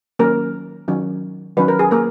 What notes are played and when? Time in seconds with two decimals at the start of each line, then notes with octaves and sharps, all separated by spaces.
0.19 D#3 F#3 A#3 C#4 A#4
0.88 D#3 F#3 C#4
1.57 D#3 F#3 C#4 B4
1.68 A#4
1.79 G#4
1.91 A#3 A#4